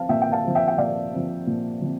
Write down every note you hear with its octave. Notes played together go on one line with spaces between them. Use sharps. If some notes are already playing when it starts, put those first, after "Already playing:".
Already playing: F3 C4 F5 A5
A#2 E5 G5
G5
F5 A5
F3 C4
E5 G5
G5
A#2 D5 F5
F3 C4
A#2
F3 C4